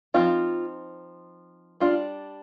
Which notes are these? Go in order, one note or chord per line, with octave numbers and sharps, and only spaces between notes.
F3 C4 D#4 F4
G3 D4 F4